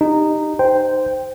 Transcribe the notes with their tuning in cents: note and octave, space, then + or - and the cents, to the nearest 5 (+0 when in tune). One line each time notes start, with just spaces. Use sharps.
D#4 -15 G4 +0
C5 -10 G5 +0